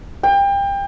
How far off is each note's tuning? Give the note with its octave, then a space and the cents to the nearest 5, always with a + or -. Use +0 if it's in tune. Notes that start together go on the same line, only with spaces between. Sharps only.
G5 +30